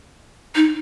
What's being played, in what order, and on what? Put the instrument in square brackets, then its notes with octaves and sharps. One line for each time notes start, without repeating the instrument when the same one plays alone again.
[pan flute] D#4